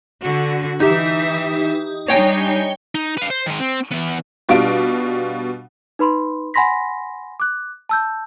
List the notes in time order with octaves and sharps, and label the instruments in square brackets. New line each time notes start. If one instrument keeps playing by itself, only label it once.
[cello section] D3 F#4
[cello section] E3 E5 [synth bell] D#4 G4
[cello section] G3 D4 D#4 [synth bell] C#5 G5 G#5
[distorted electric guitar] D#4
B4 F5
C5
D#3 G#3
C4
E3 B3
[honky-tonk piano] B2 G3 D4 F4 F5 D7
[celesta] D#4 B4 B5 C6
F#5 G#5 B5 C6 A#6 B6
D6 F#6
A5 E6 G6